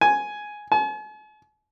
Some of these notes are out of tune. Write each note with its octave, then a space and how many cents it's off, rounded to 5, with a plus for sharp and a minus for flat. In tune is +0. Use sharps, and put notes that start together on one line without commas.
G#5 +5
G#5 +45